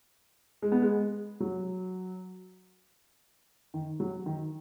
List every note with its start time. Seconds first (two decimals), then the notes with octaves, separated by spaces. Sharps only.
0.62 G#3
0.72 B3
0.82 G#3
1.40 F#3
3.74 D#3
4.00 F#3
4.26 D#3